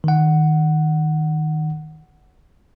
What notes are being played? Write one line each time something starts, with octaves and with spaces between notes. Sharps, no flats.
D#3 F#5